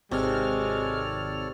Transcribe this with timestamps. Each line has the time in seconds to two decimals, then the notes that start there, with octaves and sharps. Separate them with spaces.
0.11 G#1 C3 G#3 A4 C#5 D5 F6